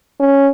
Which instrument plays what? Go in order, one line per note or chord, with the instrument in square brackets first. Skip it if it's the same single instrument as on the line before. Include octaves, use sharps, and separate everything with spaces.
[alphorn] C#4